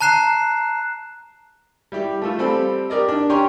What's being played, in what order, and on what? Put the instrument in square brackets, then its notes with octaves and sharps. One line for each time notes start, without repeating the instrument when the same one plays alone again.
[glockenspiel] A5 A#5 F#6 C7 E7
[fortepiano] G3 E4 G4
A3 F4 A4
G3 C4 A4 B5
G4 A#4 D5 D#5
D4
C#4 G4 C#5 G5 A#5 C6